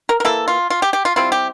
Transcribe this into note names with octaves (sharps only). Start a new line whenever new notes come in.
A#4
A#4
E3 A#3 E4 A4
F4
F4
G4
G4
F4
G3 C4 E4 F4
G4